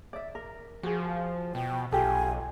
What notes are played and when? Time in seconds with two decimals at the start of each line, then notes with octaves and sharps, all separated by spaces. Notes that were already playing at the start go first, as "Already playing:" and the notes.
0.13 D5 E5
0.35 A#4
0.83 F3 F#4 G#4
1.55 B2 G5
1.92 B1 F4 G4 A4 G#5